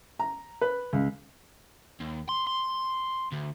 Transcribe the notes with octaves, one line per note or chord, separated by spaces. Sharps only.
A#5
B4
C#2
D#2
C6
C6
D2